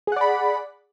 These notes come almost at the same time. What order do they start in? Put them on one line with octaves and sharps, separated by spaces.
G#4 F#5 D5 B5